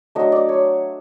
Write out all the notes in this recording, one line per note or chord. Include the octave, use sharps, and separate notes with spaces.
F#3 A3 D4 D#5
D5
C#5